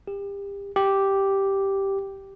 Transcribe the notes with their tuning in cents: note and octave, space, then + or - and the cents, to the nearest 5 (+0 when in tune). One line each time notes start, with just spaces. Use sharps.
G4 +30
G4 -5